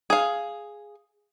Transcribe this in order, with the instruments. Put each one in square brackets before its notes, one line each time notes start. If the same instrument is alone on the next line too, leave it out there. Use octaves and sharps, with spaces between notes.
[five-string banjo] G#4 F5